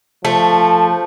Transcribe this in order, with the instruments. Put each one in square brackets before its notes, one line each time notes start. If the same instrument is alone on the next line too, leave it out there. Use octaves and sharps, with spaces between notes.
[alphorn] F3 [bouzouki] A3